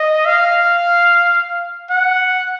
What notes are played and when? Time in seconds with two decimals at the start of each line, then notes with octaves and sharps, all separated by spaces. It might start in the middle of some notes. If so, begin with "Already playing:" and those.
Already playing: D#5
0.25 F5
1.90 F#5